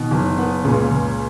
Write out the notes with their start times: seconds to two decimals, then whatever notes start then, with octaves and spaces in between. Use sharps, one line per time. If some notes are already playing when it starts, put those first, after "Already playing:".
Already playing: B2 D#3
0.11 F#1
0.38 B3
0.64 C#2 A#2 C#3
0.91 C#2